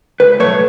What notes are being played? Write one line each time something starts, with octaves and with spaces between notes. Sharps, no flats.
C#2 B4
B2 F#3 A3 C#5